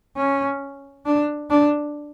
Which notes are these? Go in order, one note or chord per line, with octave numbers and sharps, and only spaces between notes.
C#4
D4
D4